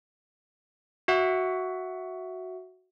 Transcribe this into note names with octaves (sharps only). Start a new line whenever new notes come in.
F#4 E5 F#5